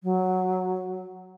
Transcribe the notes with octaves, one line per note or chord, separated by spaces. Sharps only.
F#3